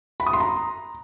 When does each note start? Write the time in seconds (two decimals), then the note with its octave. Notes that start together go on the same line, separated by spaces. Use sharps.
0.20 B5
0.26 D#6
0.33 C6
0.40 A#5